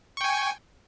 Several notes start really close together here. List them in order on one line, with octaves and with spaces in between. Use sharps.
C#6 G5 G#5